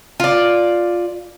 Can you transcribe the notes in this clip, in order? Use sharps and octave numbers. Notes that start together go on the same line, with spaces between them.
F4 D5